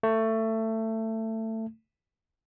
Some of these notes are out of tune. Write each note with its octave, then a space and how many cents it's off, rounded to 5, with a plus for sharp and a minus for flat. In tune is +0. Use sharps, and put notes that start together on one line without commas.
A3 +20